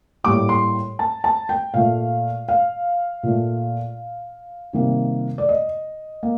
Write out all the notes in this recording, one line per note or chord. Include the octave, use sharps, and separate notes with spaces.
A2 G3 A#3 D6
C6
A5
A5
G5
A#2 A3 F5
F5
A#2 A3
C3 D#3 G3 A#3
D5
D#5
A#3